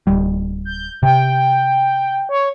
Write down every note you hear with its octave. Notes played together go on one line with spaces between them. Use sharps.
D1 G3
G6
C3 G5
C#5